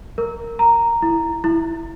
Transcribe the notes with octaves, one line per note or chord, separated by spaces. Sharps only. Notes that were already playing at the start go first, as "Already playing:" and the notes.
A#4
A#5
E4
E4